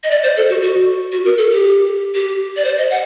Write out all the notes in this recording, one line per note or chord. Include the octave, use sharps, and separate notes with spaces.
D#5
D5
C5
A4
F#4
F#4
F#4
A#4
A4
G4
G4
D5
C5
D#5
F#5